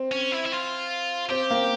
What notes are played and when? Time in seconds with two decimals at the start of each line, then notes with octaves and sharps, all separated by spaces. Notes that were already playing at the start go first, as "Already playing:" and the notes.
Already playing: C4
0.11 C#4
0.31 E4
0.45 E4
0.52 F4
1.30 C4 G4
1.51 A#3